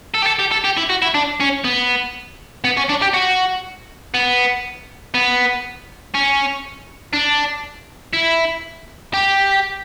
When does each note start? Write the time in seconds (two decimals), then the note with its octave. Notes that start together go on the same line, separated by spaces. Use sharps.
0.15 A4
0.23 G4
0.27 A4
0.40 G4
0.52 A4
0.65 G4
0.77 E4
0.90 F#4
1.02 E4
1.14 D4
1.40 C#4
1.64 B3
2.64 B3
2.77 C#4
2.89 D4
3.02 G4
3.14 F#4
4.14 B3
5.14 B3
6.14 C#4
7.13 D4
8.13 E4
9.14 G4